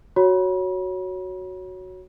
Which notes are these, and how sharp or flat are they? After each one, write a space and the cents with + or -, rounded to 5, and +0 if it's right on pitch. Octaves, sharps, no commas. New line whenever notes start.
F#4 +0 C#5 +0 B5 -40